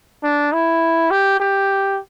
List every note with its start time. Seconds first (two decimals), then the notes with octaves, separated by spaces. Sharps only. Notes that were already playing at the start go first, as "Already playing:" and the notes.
0.24 D4
0.53 E4
1.11 G4
1.40 G4